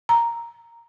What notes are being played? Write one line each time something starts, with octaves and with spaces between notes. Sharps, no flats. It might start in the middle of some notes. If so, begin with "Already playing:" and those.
A#5